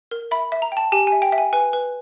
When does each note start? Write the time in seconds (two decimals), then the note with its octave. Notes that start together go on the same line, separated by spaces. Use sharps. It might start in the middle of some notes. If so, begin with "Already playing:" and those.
0.11 A#4
0.31 E5 B5
0.52 E5
0.62 A#5
0.72 G5 A5
0.92 G4 G#5
1.07 G#5
1.12 E5
1.22 G5
1.32 E5
1.38 G#5
1.53 B4 G#5
1.73 B4